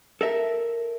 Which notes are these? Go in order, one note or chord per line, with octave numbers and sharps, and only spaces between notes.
A4 A#4 E5